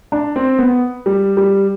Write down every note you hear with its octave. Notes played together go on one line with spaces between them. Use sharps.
D4
C4
B3
G3
G3